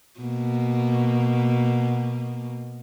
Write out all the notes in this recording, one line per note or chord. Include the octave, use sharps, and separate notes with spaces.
B2 A#3